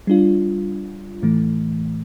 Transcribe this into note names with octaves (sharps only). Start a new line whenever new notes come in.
G3 D4 F4
A2 E3 A3